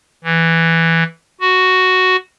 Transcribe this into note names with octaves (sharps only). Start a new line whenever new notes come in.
E3
F#4